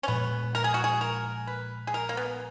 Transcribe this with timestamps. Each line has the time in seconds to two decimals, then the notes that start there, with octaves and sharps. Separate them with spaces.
0.03 C#4
0.08 A#1 A#2 F3 G#3 B3
0.55 A#4
0.64 G#4
0.74 F#4
0.84 G#4
1.01 A#4
1.47 B4
1.87 G#4
1.94 A#4
2.09 A#3
2.17 B3